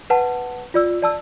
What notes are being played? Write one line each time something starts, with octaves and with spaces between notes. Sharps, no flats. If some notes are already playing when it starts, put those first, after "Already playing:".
B4 F#5 A5
F4 D5 E6
D5 A5 E6